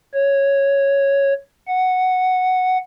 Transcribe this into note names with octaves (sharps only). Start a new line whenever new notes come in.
C#5
F#5